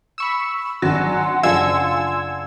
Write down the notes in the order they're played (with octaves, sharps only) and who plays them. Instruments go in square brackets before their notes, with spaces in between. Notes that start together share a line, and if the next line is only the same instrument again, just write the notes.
[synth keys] B5 C#6 E6
[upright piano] G#1 [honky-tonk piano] F#3 [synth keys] D4 E6 [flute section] F#5 G#5 C6
[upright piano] F#1 D4 C7 [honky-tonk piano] F4 [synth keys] E6 G#6